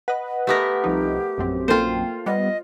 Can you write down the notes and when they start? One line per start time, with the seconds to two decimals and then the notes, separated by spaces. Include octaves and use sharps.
0.08 B4 D#5 F#5
0.47 A3 B3 G4 A#4
0.84 C2 F3 D#4
1.38 A#1 F#2 C4
1.68 A#3 F4 A4 C5 G5
2.26 G3 B3 D#5